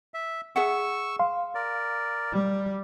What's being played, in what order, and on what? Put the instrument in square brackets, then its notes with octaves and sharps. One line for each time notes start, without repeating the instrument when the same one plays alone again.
[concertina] E5
[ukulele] G#4 E5 F#5 [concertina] C#6 E6
[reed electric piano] F5 C6
[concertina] A#4 D5
[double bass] G3